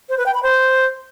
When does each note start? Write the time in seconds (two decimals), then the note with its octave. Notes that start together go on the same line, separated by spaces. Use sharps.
0.09 C5
0.18 B4
0.26 G5
0.34 B5
0.43 C5